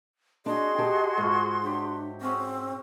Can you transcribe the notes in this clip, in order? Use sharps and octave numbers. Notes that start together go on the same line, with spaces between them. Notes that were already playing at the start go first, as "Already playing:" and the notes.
D4 F#4 G#4 D#5 C6
G4 A5
G#2 A3 F4
F#3 D4 G4
G#3 C4 C#4 F#4